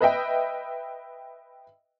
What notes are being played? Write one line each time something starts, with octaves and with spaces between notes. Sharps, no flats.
B4 D#5 E5 G5